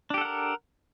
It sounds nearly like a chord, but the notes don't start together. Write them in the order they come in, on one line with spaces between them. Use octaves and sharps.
D4 G4 A4 F#5 A#4